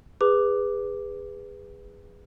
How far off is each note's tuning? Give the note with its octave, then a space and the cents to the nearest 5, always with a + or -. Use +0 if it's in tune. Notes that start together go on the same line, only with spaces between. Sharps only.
G#4 -25 B4 +0 D6 +0